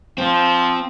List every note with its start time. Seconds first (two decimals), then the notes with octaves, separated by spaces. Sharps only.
0.18 F3 C4